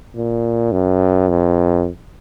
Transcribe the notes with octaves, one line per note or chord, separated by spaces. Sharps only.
A#2
F#2
F2